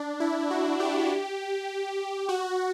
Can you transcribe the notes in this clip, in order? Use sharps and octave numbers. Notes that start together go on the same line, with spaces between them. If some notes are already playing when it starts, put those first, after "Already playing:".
Already playing: D4
E4
F#4
G4
F#4